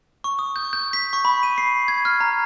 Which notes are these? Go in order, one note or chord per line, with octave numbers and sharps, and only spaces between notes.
C#6
D#6
G6
G6
B6
C#6
B5
D#7
C7
G#6
F6
A#5